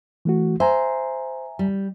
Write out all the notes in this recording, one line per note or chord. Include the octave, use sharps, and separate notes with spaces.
E3 A3 F#4
C5 E5 G#5 A#5
G3